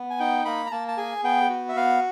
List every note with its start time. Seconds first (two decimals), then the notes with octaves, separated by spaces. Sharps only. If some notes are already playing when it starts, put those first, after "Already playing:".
Already playing: B3
0.10 G#5
0.20 D#4 G5
0.45 A#3 B5
0.66 A#5
0.72 A#3 A5
0.88 A5
0.97 G#4 G#5
1.23 B3 G5
1.50 F#4
1.69 E5
1.76 B3 F5